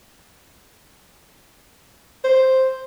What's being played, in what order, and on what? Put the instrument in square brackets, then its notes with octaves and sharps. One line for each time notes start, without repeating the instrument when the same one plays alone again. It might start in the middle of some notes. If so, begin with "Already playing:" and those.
[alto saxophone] C5